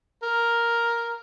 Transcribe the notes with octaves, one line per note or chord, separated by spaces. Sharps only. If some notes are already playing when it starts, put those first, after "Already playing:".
A#4